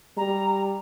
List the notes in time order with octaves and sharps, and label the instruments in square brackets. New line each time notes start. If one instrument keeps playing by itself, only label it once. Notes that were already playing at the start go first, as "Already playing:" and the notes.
[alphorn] G3 [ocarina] A#5